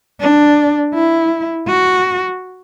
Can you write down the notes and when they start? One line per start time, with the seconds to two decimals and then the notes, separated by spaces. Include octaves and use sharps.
0.20 D4
0.94 E4
1.68 F#4